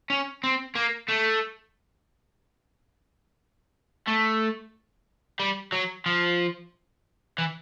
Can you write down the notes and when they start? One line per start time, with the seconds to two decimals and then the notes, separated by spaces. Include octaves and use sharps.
0.10 C#4
0.44 C4
0.76 A#3
1.09 A3
4.07 A3
5.40 G3
5.72 F#3
6.06 F3
7.38 E3